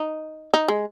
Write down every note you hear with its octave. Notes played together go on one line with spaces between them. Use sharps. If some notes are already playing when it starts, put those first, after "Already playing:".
Already playing: D#4
D#4
G#3